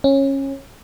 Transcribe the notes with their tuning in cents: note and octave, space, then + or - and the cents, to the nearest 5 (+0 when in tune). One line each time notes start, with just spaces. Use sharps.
C#4 -20